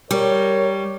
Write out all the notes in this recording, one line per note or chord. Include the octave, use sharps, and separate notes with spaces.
G3 A#4 C#5